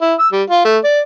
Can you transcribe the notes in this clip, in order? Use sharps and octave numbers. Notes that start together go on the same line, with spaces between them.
E4
E6
G3
F4
A3
D5